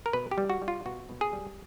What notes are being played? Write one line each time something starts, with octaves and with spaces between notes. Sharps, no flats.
A#4
B2 B4
G4
G3
F#4
G3
F4
B2 F#4
B2
G#4
G3